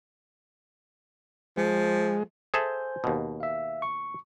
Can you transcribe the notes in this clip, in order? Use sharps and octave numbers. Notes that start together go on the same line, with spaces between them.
F3 G#3
G#4 A4 C5 E5 G#5 G6
D#2 B2
E5 F5
C#6